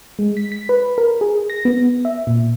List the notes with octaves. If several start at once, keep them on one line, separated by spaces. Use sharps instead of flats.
G#3
B6
B6
B4
A#4
G#4
A#6
B3
E5
A#2